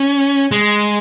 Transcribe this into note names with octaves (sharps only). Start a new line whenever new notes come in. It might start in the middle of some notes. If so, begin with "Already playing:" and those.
Already playing: C#4
G#3